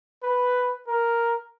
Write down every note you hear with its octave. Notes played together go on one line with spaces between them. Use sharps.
B4
A#4